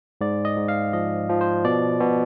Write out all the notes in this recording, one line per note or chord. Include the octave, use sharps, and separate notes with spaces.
G#2 D5
D#5
G#2
F5
F3 D#5
F3
C5
B2 D5
B2